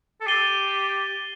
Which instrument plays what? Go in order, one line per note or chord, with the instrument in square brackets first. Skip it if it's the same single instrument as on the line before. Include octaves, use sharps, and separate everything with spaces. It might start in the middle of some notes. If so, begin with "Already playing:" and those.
[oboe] A4
[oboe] G4 [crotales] A6 C7 D#7 G7